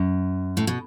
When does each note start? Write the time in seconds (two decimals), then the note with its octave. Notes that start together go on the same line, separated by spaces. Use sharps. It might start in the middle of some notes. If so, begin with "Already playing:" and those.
Already playing: F#2
0.57 A2
0.67 B2